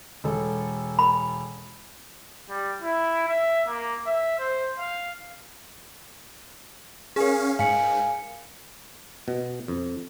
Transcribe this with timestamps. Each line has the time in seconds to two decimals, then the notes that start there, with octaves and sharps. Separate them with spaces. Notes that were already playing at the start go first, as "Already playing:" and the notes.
0.24 E1 A4
0.99 B5
2.50 G3
2.82 E4
3.29 E5
3.67 A#3
4.06 E5
4.39 C5
4.79 F5
7.16 C#4 G#4 A#4 F5
7.59 G#2 F5 G#5 C#7
9.28 B2
9.68 F2